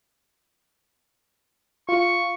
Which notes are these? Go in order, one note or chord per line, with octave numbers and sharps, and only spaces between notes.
F4 C#6